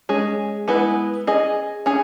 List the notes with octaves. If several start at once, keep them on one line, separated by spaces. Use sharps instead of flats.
G#3 C#4 G#4
G#3 B3 E4 B4
C#4 G#4 D#5
C#4 G#4